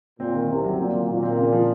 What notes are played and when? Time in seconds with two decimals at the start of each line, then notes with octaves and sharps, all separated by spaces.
0.20 A#2 C4
0.34 D#3
0.49 C2 F#2 C3
0.64 F#3
0.79 A#2 C4
0.94 F#3
1.08 A#2 D#3
1.23 C4
1.38 C#3
1.53 F3